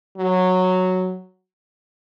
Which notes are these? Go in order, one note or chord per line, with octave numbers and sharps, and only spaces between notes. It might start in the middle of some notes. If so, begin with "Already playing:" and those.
F#3